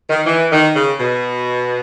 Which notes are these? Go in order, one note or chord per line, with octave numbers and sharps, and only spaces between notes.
D#3
E3
D#3
C#3
B2